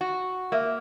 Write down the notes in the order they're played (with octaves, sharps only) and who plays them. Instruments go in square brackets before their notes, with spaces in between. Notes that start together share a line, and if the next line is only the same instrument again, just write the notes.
[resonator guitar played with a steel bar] F#4
[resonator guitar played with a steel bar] A#3 [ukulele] E5